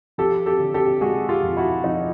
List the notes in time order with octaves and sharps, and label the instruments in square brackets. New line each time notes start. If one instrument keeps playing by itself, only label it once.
[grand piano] F3 G4 A4
G4 A4
D3
G4 A4
G#3 F#4 G#4
F4 G4
F2
E4 F#4
F3 D#4 F4